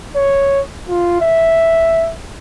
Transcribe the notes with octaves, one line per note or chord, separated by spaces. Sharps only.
C#5
F4
E5